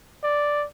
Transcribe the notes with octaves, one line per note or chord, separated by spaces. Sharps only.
D5